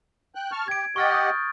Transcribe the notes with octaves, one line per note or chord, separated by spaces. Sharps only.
G5 F#6
A5 C#6 F6
G4 G#6 D7
G4 D#5 F#5 C#6 F6 A6
D#6 G6